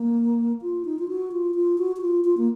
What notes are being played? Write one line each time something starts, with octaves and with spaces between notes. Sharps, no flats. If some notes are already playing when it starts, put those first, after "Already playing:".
Already playing: A#3
F4
D#4
F4
F#4
F4
F4
F#4
F#4
F4
F4
A#3